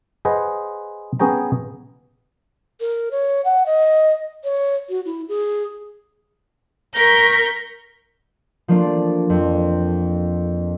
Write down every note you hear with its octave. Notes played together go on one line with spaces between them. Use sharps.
G#4 B4 C5 D#5 F#5
B3 C#4 G#4 C#5 G5 A#5
A#4
C#5
F#5
D#5
C#5
F#4
E4
G#4
A#4 C#6 G6 B6
F3 A3 A#3 D4 D5
F2